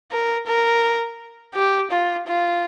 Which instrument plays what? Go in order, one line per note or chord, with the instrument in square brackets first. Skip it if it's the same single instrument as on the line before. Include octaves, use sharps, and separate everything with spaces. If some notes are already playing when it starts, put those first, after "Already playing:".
[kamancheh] A#4
A#4
G4
F4
F4